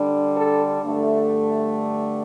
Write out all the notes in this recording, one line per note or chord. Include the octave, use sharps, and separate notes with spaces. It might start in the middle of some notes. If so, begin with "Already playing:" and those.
Already playing: D3 G3 D4
A4
G2 D3 A3 D4